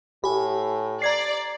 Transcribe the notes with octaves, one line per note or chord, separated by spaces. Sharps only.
A2 G4 G#5 B5
D5 A#5 G#6 C7